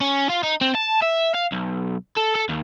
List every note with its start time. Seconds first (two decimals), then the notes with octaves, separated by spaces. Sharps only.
0.01 C#4
0.29 F4
0.43 D#4
0.61 C4
0.75 A5
1.02 E5
1.34 F5
1.52 B1
2.17 A4
2.35 A4
2.49 D#2